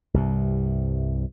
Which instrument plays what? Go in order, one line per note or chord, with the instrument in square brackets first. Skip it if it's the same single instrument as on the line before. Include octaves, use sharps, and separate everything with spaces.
[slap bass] C2 G2 C3